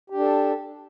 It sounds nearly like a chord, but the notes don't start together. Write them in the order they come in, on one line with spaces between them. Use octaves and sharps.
G4 D4 A4